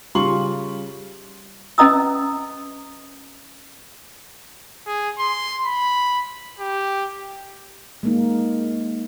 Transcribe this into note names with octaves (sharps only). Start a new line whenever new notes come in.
C#3 G3 F4 C6 C#6 F#7
C#4 B4 D#5 A#5 D#6 E6
G#4
C6
B5
G4
G#3 A#3 D#4